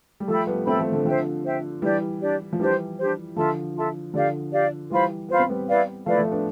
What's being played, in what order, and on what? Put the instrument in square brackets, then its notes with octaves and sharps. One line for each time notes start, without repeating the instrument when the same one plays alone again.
[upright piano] G3
[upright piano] F3 A3 [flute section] A4 E5 G5 B5
[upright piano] G3 B3
[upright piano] A3 C4 [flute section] A4 E5 G5 B5
[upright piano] F3 A3
D3 F3
[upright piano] D3 F3 [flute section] C5 E5 G5
[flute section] C5 E5 G5
[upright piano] E3 G3 [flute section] D4 G4 D5
[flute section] D4 G4 D5
[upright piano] F3
[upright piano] E3 G3 [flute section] D4 G4 C5
[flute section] D4 G4 C5
[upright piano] D3 F3 [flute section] F4 A4 E5 A5
[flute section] F4 A4 E5 A5
[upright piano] D3 F3 [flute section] G4 D5 F5
[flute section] G4 D5 F5
[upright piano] E3 G3 [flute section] F4 C5 F5 B5
[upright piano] B3 [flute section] F4 C5 F5 B5
[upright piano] C4
G3 B3
[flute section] E4 B4 D5 F5
[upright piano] F3 A3 [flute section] E4 B4 D5 F5
[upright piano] F3 A3
B3 D4